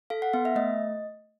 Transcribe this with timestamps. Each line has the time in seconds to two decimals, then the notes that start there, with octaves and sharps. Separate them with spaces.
0.10 A4 F5
0.22 F#5
0.33 B3 F5
0.45 E5
0.56 A3 D#5